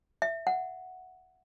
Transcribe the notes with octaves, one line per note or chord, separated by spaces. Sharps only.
E5
F#5